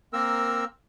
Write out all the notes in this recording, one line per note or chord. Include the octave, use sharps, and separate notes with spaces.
A#3 C4 A#4 E6